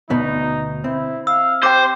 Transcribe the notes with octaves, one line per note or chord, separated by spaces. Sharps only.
D2 B2 B3 D#4
C4 E4
F5 E6
G4 C5 G5 D6